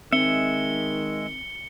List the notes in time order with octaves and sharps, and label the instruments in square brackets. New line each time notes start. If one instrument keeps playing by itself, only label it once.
[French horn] D#3 [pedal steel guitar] G#3 E5 [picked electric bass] C4 [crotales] C#7 G7